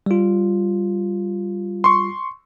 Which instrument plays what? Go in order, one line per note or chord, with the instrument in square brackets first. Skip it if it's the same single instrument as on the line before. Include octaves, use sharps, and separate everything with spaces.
[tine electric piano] G3 F4
[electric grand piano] C6 C#6